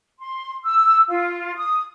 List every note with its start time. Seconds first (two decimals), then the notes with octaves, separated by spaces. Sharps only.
0.19 C6
0.63 E6
1.09 F4
1.56 D#6